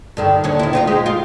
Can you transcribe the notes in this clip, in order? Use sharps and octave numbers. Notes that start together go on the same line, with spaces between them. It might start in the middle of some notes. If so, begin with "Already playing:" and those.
G2 D3 D#3
D#2 D3 C#5
D#3 E4
C4 D#4 F4
G#3 D#4 G4
F4